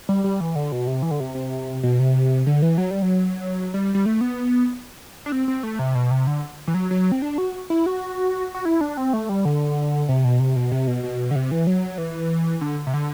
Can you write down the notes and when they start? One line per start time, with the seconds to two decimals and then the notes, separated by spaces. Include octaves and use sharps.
0.09 G3
0.24 G3
0.40 E3
0.55 D3
0.72 B2
0.87 C3
1.02 E3
1.11 D3
1.20 C3
1.35 C3
1.83 B2
1.99 C3
2.47 D3
2.62 E3
2.78 F#3
2.91 G3
3.02 F#3
3.74 G3
3.95 G3
4.06 A3
4.21 B3
5.26 D4
5.32 C4
5.48 C4
5.63 A3
5.79 C3
5.95 B2
6.11 C3
6.27 D3
6.67 E3
6.74 F#3
6.91 F#3
7.12 C4
7.22 D4
7.38 F#4
7.70 E4
7.86 F#4
8.55 F#4
8.65 E4
8.81 D4
8.97 C4
9.13 A3
9.29 G3
9.45 D3
10.09 C3
10.24 B2
10.40 C3
10.56 B2
10.72 C3
10.87 B2
11.03 B2
11.31 D3
11.35 C3
11.51 E3
11.67 F#3
11.98 E3
12.61 D3
12.87 C3
12.94 D3